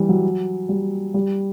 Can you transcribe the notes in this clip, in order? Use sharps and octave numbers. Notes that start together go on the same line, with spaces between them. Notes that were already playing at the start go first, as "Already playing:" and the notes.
Already playing: E3 G3
F#3
G3
G3